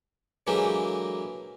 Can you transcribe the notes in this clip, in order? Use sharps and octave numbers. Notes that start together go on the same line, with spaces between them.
D3 E3 F#3 G#3 A#3 G4